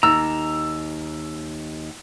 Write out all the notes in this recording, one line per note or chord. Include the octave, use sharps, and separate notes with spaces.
D#2 A#5 E6